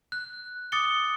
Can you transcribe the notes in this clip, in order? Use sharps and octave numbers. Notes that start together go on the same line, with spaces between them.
F#6
D6 D#6 A6 C#7 G7